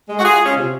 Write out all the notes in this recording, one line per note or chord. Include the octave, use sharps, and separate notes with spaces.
G#3
F#4
G#3 F4 G#4
G#3
C#4 F4
C3